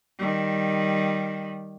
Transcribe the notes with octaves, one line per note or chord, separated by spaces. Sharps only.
D#3 G3